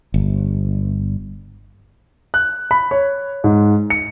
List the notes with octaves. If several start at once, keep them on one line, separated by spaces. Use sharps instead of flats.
G1
F#6
B5
C#5
G#2
C#7